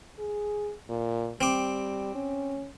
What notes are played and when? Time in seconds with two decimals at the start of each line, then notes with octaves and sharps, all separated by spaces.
0.19 G#4
0.89 A#2
1.41 G3 C4 D6
2.15 C#4